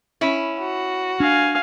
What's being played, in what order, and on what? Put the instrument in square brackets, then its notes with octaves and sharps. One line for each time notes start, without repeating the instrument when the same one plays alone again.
[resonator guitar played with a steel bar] C#4 E4
[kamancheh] F#4
[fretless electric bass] D4 [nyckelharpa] F5 G#5